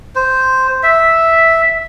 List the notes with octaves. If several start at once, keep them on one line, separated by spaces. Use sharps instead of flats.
C5
E5